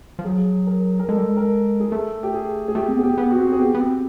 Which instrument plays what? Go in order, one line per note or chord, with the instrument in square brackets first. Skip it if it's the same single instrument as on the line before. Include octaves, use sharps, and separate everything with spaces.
[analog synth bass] F3
[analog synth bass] F#3 [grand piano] G#4
[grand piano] A#4
A#4
[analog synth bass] G#3 [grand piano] A4
[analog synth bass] G3
G#3
[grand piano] A#4
G#4
[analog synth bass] A3 [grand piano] A4
[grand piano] G4
G#4
G#4
[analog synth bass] A3 [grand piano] G4
[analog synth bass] C4
[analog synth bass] B3 [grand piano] G#4
[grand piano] G4
[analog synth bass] B3
[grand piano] F#4
[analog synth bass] C4
[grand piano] G#4
[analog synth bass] B3 [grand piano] G4
[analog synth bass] B3
C4